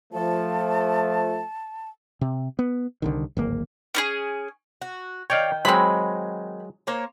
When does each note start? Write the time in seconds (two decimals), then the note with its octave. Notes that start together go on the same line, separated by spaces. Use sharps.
0.13 F3 A3 A5
2.21 C3
2.59 B3
3.02 C2 D3 D#3
3.37 D1 G#1 A#3
3.95 C#4 D#4 G#4
4.82 F#4
5.30 D#3 C#5 D5 F5 G5
5.65 F#3 G#3 C4 B5
6.87 A#3 C5 C#5